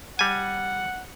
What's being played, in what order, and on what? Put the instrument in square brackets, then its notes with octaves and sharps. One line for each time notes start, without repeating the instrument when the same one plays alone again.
[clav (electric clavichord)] G3 G#5 [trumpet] F#5